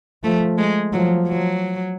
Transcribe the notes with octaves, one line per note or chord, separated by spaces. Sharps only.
F3 A3
G#3
F3 F#3
F#3